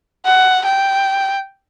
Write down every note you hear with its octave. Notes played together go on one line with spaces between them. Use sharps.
F#5
G5